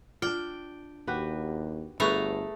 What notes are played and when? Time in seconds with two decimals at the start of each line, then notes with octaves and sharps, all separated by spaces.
0.22 D4 F4 D5 G5
1.07 D#2 F#4 G4 B4
2.00 G1 A3 G#4 B4 A#5 B5 C#6 F#6